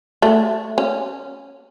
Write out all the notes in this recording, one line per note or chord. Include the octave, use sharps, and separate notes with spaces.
A3
C#4